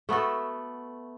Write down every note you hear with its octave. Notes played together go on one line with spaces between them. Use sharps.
A3 B3 F#4 A4